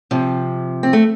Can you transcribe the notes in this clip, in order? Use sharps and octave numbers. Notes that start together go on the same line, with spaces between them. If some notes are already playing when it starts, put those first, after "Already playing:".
C3 F3
C4
A3